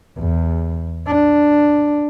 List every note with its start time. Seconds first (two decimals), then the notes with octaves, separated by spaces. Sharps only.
0.18 E2
1.07 D4